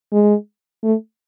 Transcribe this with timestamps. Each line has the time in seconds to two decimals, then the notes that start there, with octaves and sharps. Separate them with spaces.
0.13 G#3
0.84 A3